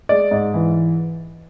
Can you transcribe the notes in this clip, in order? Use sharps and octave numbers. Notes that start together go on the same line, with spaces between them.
G#3 D5
G#2
E3